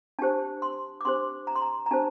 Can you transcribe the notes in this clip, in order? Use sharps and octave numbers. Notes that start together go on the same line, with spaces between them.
D4 G4 C5 A5
C6
D6
D4 G4 C5 C6
A#5
C6
A#5
A#5
D4 G4 C5 A5